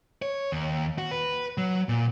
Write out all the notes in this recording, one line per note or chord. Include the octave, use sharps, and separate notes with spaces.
C#5
D#2
F#4
B4
F#3
A#2